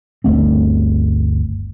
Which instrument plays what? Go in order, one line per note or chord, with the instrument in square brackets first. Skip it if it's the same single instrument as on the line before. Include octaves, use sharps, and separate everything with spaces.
[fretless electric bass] G1 D2 A3 C4